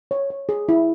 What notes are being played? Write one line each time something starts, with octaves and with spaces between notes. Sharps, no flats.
C#5
C#5
G#4
E4